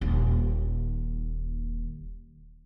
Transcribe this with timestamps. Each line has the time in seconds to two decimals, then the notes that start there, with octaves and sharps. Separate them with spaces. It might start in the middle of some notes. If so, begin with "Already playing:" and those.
0.01 D#1 D#2